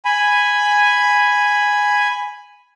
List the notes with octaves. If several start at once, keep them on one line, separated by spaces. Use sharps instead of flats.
G#5 B5